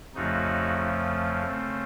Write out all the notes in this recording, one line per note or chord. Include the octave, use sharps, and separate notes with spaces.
F2 C#3 F3 A3 D#4 F#4
C#3 A3 C4